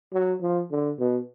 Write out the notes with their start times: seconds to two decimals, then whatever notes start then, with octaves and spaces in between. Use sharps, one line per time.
0.14 F#3
0.42 F3
0.71 D3
0.99 B2